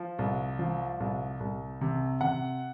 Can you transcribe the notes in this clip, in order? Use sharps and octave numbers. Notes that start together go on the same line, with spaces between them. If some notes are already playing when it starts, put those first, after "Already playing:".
Already playing: F3
C2
F3
C2
C2
C3
C3 F#5